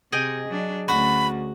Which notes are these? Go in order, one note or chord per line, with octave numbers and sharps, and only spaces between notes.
C3 G#4 D#5 G5
F#3 D4
D2 C#4 F#4 B5